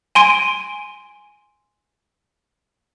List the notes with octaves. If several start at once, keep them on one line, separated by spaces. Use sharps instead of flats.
G#5 C6 D7 D#7